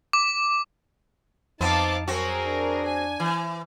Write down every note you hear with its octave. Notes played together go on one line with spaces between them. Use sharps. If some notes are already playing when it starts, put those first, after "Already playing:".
D6
F2 B3 C4 D#4 F5 A5 D6
F#3 C4 F#4 G#4 A#4
D4
G#5
E3